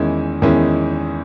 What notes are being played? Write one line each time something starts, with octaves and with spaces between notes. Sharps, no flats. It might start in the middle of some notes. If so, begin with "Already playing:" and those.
Already playing: E2 D#3 G#3 C#4 E4
E2 D#3 G#3 C#4 E4